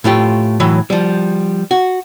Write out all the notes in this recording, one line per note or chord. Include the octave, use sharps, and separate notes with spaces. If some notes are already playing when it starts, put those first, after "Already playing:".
A2 A3 F4 G4
A2 E3 F#3
F3 G3
F#4